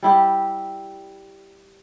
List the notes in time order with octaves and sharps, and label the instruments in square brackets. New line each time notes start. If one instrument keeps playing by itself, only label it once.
[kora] G3 E4 G4